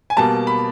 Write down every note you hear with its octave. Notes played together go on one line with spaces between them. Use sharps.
G#5
B2 G3 A#3 A5
B5